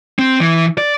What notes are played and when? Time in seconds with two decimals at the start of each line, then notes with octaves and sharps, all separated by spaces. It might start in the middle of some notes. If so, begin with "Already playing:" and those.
0.19 C4
0.41 E3
0.78 D5